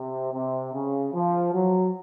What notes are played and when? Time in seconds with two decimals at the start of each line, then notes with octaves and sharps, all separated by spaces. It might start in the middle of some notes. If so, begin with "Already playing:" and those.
Already playing: C3
0.33 C3
0.73 C#3
1.13 F3
1.53 F#3